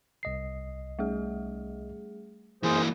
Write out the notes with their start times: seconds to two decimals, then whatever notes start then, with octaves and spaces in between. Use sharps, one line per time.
0.23 C2 D#5 C7
0.99 G3 A3 G#4
2.63 F#2 E3 A#3 G#4 C5